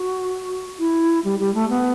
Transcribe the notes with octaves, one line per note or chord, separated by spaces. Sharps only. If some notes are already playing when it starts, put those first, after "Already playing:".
Already playing: F#4
E4
G3
G3
A3
B3